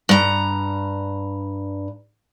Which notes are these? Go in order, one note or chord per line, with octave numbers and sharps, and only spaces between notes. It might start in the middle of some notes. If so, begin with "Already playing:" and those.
G2 A#5